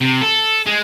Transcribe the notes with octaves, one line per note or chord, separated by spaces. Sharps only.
C3
A4
G#3